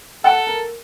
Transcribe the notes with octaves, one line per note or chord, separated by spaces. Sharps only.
A4 F#5
A#4